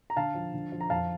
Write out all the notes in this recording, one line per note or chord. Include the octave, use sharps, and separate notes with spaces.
A#5
D3 F5 A5
F3
D3
F3
A#5
F2 F5 A5